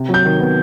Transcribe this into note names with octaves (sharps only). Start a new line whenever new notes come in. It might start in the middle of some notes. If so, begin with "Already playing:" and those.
Already playing: C3
F#3
G6
D#3
B3